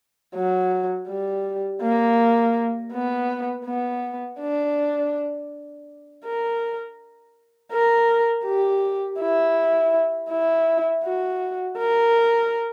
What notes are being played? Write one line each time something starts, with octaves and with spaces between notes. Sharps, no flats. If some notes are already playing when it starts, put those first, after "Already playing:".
F#3
G3
A#3
B3
B3
D4
A#4
A#4
G4
E4
E4
F#4
A#4